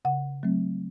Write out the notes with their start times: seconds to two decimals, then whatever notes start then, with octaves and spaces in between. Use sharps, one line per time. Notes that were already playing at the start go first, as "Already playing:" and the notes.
0.05 C#3 F#5
0.43 F#3 A3 C4